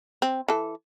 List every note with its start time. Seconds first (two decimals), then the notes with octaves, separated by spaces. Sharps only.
0.22 C4
0.48 E3 A4